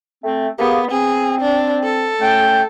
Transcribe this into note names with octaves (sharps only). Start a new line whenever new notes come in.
A3 C4
A#3 B3 G4 G#4
C4 G#4
D4
A4
A3 C#4 G5